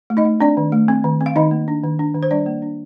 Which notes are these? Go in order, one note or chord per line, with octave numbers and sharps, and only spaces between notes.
A3
D#4 D#5
A3
C4 D4 D5
D#3
A3
C4
D#3
C4
F5
D#3 D#4 D#5
A#3
D4
D#3
D4
D#3
C5
G3 D4 D5
A#3
D4